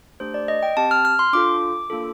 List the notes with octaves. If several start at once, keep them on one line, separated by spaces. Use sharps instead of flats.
A3 D4 G4 C5
D5
D#5
G5
C4 G4 A5
F6
F6
C6
D4 F4 A4 D6
A#3 D4 F4 A4